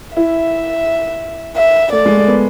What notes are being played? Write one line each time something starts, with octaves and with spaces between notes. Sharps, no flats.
E4 E5
E5
A3 D5
G#3
A3
B3